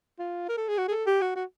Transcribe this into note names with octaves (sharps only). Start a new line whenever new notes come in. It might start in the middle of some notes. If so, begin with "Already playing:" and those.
F4
A#4
A4
G#4
F#4
G#4
A4
G4
F#4
F#4